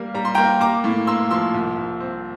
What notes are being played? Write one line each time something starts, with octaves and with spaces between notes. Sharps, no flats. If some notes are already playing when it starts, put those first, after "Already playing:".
Already playing: G3 A#3 F5
G3 A#5
C6
A#3 G5 A#5
A#3 A#5 D6
A2
A#3 C6 E6
F3 C6 E6
C2
C2
C4